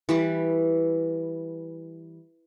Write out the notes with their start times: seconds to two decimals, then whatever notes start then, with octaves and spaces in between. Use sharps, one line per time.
0.09 E3 G3 B4